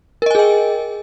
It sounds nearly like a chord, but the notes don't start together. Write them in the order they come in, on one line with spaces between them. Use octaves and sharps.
A#4 D#5 G#5 G#4 G5